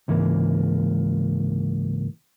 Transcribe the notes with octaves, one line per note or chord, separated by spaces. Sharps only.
C#2 G#2 E3 A#3